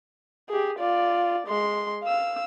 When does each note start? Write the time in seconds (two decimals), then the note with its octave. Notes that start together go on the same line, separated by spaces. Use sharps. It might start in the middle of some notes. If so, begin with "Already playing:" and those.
0.49 G4 G#4
0.79 F4 D5
1.48 G#3 C6
2.04 F5 E6